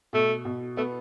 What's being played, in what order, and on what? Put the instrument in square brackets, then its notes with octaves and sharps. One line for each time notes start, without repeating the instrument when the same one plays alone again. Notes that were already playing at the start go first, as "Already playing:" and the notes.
[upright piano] B2 [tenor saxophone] A3
[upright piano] B2
[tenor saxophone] A3 [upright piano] B3